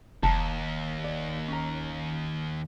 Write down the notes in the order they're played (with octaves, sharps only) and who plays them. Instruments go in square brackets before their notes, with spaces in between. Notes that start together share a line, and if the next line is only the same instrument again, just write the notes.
[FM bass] F1 [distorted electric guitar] D#2 [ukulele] A5 A#5
[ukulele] D5
C#4 A#5